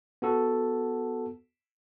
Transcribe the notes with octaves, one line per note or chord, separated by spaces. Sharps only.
B3 F#4 A4